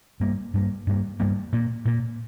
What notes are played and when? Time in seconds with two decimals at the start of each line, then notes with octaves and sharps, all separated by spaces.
0.20 G2 G3 A#3
0.54 G2 G3 A#3
0.87 G2 G3 A#3
1.20 G2 G3 A#3
1.52 A#2 A#3
1.85 A#2 A#3